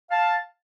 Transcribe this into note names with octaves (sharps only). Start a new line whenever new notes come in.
F5 A5